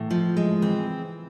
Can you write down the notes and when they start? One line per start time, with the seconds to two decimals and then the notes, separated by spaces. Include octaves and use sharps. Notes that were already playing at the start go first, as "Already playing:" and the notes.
Already playing: A2 E3
0.11 F3
0.37 G#3
0.62 E3 C4